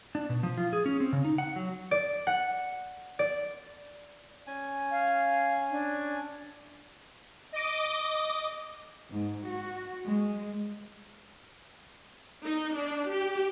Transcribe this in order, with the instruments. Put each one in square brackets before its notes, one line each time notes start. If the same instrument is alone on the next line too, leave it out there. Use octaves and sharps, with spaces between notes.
[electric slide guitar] D4
B2
F3
F4
G#4
C#4
C4
C#3
D#4
F#5
F#3
[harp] D5
F#5
D5
[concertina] C#4 G#5
[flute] F5
D4
[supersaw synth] D#5 D6
[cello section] G#2
F#4
G#3
[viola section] D#4
D4
G4